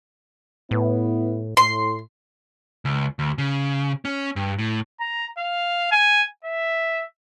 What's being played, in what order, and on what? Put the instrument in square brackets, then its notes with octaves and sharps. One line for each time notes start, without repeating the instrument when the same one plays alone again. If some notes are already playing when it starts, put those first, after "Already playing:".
[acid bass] A2 [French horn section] B3 E4 B4
[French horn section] A2 [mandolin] C6
[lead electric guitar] C#2
D2
C#3
C#4
G2
A2
[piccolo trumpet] A#5
F5
G#5
E5